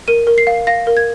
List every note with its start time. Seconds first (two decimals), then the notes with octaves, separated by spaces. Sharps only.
0.08 A#4 D#7
0.27 A#4
0.38 C7
0.47 F5
0.67 F5 A#6
0.87 A#4
0.97 G#6